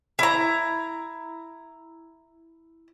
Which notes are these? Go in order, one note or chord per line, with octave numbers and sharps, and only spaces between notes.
E4 A#5